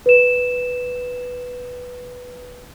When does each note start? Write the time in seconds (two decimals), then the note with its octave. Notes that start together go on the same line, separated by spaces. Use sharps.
0.06 B4 E7